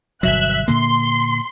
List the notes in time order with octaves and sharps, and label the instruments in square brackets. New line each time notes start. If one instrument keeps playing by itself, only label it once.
[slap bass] G1 B2 F#3 [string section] E5 F#6
[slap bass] A#2 D3 A#3 [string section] C6